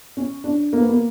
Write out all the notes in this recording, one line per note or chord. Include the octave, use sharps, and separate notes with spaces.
C#4
D4
A#3
B3
A#3